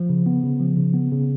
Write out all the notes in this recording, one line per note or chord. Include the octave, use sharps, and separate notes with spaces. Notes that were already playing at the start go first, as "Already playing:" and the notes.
Already playing: F3
C#3
B3
C#3
F3
C#3
B3
C#3